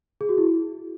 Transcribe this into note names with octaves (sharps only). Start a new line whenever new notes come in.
G#4
F#4
E4